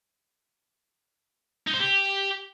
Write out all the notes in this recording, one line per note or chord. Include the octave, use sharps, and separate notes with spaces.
D#4
C5
G4